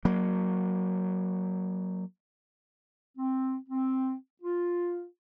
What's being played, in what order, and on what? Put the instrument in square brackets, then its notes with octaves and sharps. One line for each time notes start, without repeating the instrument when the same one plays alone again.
[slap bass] F#3 A#3
[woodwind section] C4
C4
F4